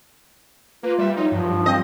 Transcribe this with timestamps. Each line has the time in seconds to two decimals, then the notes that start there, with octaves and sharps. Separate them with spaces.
0.83 A#3 F4 B4
0.98 G3 E5
1.17 F#3 D#4
1.32 G2 F3
1.66 C4 D#5